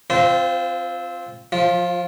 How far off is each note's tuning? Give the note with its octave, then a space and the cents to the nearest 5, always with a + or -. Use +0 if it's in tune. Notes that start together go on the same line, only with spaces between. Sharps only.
C4 +0 F4 +0 C5 -35
F3 +30 F4 +0